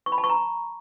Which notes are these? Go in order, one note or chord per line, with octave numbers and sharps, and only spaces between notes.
C#6
B5
A5
C#6
A#5